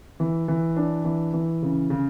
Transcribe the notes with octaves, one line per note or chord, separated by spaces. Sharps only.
E3
E3
D4
E3
E3
C#3
C#3